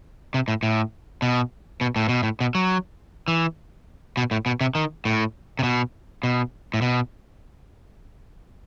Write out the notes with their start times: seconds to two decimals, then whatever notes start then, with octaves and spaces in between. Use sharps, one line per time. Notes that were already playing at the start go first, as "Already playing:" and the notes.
0.34 C3
0.48 A2
0.63 A2
1.22 B2
1.81 B2
1.96 A2
2.09 B2
2.23 A2
2.40 B2
2.55 F#3
3.28 E3
4.17 B2
4.31 A2
4.46 B2
4.61 C3
4.75 D#3
5.05 A2
5.59 C3
5.63 B2
6.23 B2
6.74 A2
6.82 B2